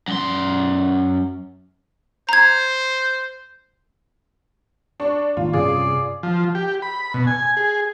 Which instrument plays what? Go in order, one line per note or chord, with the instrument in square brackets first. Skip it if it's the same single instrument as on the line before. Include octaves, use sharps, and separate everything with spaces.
[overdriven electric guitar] F#2 C6
[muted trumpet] C5 [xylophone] A#5 G#6
[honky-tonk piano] D4 C#6
[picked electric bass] A2 D#3 A#3 [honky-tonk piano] F4
[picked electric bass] G2 C3 C#4 [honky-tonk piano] F4 G#4 [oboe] D5
[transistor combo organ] F3
G4
B5
B2
G#5
G#4